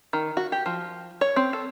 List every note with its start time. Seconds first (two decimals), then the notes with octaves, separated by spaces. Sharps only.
0.13 D#3
0.37 F#4
0.52 G4
0.66 F3
1.21 C#5
1.36 C4
1.53 A4